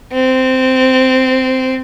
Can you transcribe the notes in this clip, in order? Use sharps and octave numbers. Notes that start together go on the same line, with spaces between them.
C4